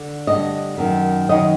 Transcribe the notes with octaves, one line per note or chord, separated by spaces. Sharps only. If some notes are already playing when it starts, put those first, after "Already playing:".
Already playing: D3
G2 D3 D#5
F#2 D#3
F#2 D#3 D#5